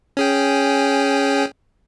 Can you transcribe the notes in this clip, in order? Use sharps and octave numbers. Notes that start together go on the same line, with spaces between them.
C#4 G#4 G5